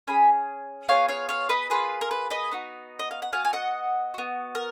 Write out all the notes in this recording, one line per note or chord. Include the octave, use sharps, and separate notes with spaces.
C#4 G#4 G#5 B5
B3 F4 G#4 C#5 F5
C#5 F5
C#5 F5
B4 D#5
A#3 F4 G#4 B4
A#4
B4
B4 D#5
B3 D#4 F#4
D#5
F5
F#5
B3 F#4 F5 G#5
G#5
D#5 F#5
B3 F#4
A#4